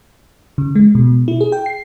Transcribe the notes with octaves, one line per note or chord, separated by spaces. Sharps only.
C#3
G#3
B2
E4
G#4
G5
C7